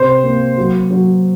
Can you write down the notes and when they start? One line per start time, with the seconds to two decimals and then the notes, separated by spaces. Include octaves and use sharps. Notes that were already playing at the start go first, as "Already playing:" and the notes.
Already playing: C3 C5
0.24 A#3
0.58 F#3
0.91 F#3